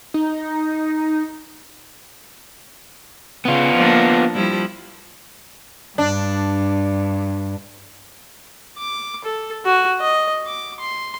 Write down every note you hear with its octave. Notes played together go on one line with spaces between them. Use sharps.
D#4
C#3 B3 F4
F3 A#3 D4
F3 G3 E4
G2 D4
D6
A4
F#4
D#5
D6
C6